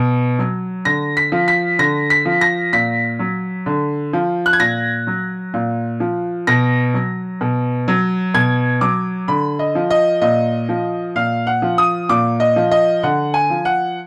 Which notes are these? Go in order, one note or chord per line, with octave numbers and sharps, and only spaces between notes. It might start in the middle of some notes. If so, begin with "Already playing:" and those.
Already playing: B2
F#3
D3 A#6
B6
F3
B6
D3 A#6
B6
F3
A#6
A#2 B6
F#3
D3
F3
F#6
G#6
A#2 A#6
F#3
A#2
F3
B2 A#6
F#3
B2
F#3
B2 G#6
F#3 D6
D3 B5
D#5
F3
D#5
A#2 D#5
F3
A#2 F5
F#5
F3
D#6
A#2 D6
D#5
F3
D#5
D3 F#5
G#5
F3
F#5